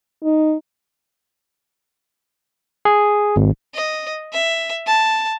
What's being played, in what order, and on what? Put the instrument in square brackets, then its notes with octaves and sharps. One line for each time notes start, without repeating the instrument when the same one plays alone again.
[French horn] D#4
[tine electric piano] G#4
G#1
[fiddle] D#5
E5
A5